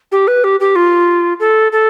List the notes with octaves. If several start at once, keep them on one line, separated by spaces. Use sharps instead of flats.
G4
B4
G4
G4
F4
A4
A4